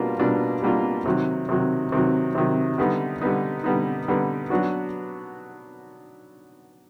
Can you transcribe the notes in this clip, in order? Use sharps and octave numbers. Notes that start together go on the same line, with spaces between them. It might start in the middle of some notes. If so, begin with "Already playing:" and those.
Already playing: B2 G3 A#3 D4 F4
B2 G3 A#3 D4 F4
B2 G3 A#3 D4 F4
C3 D#3 F#3
C3 D#3 F#3
C3 D#3 F#3
C3 D#3 F#3
D3 G3 B3 D#4
D3 G3 B3 D#4
D3 G3 B3 D#4
D3 G3 B3 D#4
F#3 B3 D4 F#4